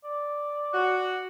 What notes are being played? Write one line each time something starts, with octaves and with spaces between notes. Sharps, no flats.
D5
F#4